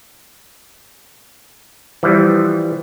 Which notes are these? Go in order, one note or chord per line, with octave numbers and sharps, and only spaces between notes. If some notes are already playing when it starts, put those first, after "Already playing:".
E3 F3 G3